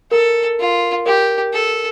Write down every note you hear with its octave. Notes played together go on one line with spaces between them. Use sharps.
A4 A#4
F4
G4 A#4
A4